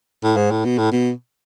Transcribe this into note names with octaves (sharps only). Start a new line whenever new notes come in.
A2
G#2
A2
B2
A2
B2